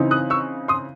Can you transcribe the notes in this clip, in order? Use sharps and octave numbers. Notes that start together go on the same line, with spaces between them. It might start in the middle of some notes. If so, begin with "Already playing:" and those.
Already playing: C#3 E3 C4 D#4
D#6 F#6
C#6 E6
C6 D#6